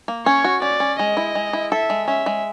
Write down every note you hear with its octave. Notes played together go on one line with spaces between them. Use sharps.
A#3
C#4 C#5
F#4
C#4 D5
C#4
G#3 D#5
E4
G#3
E4
A4 E5
G#3
C#4 E5
G#3